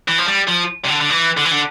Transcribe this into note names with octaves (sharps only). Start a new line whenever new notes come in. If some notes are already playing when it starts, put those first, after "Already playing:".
E3
F3
G3
F3
C3
D3
D3
E3
D3
E3
D3